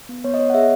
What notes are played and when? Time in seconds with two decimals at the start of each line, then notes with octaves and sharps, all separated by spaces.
0.09 B3
0.24 B3 C#5
0.34 D#5
0.39 B3 C#5
0.50 F#5
0.54 G#4 E5